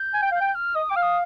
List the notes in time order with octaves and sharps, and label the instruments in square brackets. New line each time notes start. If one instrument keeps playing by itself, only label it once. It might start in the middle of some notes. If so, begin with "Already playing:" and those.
Already playing: [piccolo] G6
[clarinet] G#5
G5
[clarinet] F5 [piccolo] G6
[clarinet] G5
[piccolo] F6
[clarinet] D#5 [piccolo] D#6
[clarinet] G5 [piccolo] D6
[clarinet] F5 [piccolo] F6
[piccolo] D#6